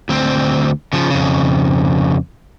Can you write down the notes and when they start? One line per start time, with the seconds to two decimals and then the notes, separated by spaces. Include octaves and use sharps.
0.09 D2 C4
0.93 C#3 F3
1.10 F2 C#3